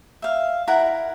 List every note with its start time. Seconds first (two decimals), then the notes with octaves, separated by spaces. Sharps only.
0.22 E5 F5
0.68 E4 A#4 F#5 A#5